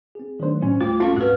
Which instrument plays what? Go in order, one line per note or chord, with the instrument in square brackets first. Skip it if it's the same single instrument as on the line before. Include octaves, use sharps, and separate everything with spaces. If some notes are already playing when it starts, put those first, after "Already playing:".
[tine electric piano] C4 G#4
[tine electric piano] D#3 F#3 A3 [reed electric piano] D4 C5
[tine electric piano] A2 [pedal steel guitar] C#4
[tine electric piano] D2 G3 [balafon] A3 [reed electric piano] F4 [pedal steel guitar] D6
[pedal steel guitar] A3 C#6 [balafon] C4 C#4 F5 [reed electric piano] F4 A4
[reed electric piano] G#2 [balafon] F#4 B4 [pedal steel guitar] F#5 F6